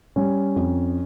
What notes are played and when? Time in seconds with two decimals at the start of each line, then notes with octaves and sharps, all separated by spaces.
0.16 G3 C#4
0.56 F2